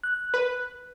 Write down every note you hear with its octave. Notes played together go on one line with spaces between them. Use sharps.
F#6
B4